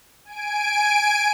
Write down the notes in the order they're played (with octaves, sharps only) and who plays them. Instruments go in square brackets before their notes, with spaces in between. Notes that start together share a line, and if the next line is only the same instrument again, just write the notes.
[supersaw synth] G#5 D7